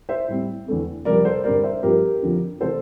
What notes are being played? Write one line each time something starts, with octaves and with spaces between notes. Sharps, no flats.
C5 E5
A2 G3 C4
E2 D3 A3 C4
F2 C3 G3 A#4 D5
A4 C5
G2 D3 G3 C4 A#4 D5
C5 E5
G2 F3 C4 G4 A#4
F2 D3 F3 C4
C3 E3 A3 A4 C5